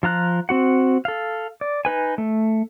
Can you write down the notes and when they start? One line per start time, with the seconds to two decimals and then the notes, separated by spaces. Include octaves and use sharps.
0.03 F3 F4 A#5 F#6
0.49 C4 F#4 F#5
1.05 A4 F5
1.61 D5
1.85 D#4 B4 G#5
2.18 A3